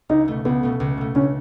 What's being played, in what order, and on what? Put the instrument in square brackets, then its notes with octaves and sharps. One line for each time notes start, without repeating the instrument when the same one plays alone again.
[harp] C#2 [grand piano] D#4
[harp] B2 A3
[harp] C#2 [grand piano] B3
[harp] B2 A3
C#2
B2 A3
[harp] C#2 [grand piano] C#4